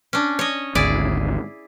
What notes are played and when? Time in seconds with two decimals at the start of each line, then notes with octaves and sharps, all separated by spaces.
0.13 C#4 D4
0.39 C#5 D#5
0.75 G#1 D2 E4 G#4 D5